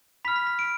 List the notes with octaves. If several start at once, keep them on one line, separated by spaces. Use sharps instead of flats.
B5 F6 B6
B6
B6
D7